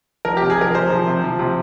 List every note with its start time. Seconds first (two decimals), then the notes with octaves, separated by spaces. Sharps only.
0.25 F3 A#4
0.37 C3 G4
0.50 G#4
0.58 F3 A#4
0.74 C3 C5
0.90 F3
1.07 C3
1.24 F3
1.39 C3